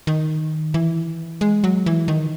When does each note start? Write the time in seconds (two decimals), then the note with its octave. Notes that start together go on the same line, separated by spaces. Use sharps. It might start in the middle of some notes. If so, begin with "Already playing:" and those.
0.07 D#3
0.74 E3
1.41 G#3
1.64 F#3
1.86 E3
2.08 D#3